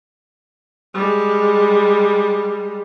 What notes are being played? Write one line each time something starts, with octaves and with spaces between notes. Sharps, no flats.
G3 G#3